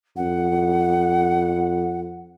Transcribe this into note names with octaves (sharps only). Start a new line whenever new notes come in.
F2 F#5